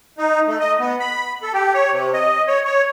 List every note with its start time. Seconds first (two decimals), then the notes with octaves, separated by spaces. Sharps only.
0.18 D#4
0.47 A3
0.60 D#5
0.80 B3
1.00 B5
1.42 A4
1.54 G4
1.74 C#5
1.92 C3
2.13 D#5
2.48 C#5
2.65 C#5